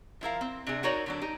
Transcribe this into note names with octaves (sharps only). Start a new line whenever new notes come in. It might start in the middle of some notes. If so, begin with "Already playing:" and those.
F3 E4 A#4 F5
C4
C3 D4 G#4
D#4 F#4 A#4 C#5 D5
D3 F#3 D4
D#4 G4